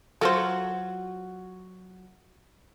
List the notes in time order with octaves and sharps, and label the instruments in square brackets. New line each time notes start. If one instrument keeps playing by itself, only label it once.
[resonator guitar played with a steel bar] F#3 F4 F#4 [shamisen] A4 C5